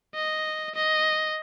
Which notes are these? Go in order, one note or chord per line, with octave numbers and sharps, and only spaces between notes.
D#5
D#5